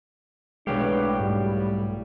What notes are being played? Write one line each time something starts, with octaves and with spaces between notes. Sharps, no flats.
B1 A2 F#3 G#3 D4 G4 B4 F5
G#2 G3